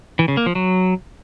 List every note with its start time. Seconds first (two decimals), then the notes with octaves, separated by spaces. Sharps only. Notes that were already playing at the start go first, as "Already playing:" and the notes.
0.19 E3
0.28 C#3
0.37 A#3
0.46 F3
0.55 F#3